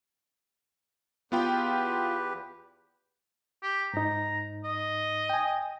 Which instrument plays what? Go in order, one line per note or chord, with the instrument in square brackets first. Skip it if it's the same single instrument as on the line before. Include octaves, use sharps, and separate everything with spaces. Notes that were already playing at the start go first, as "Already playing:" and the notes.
[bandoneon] E2 G4 B4 [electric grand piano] B3 F4 G5
[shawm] G4
[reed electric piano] G#2 D#4 [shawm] A#5
[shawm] D#5
[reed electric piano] G5 G#5